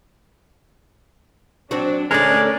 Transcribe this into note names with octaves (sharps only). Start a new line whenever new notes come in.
F#3 C4 D4 F#4
D2 D3 G#3 C#4 A#4 D5